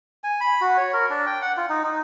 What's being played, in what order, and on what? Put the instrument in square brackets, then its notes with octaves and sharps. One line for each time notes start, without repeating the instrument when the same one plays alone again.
[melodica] G#5
B5
F#4
C#5
A#4
D4
G5
F#5
F4
D#4
D#4